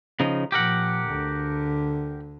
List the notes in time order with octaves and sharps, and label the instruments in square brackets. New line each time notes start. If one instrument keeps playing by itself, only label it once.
[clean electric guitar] C#3 F3 D#4
[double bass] A#2 F3 [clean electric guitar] G4 A#4 F#5
[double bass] D2 D3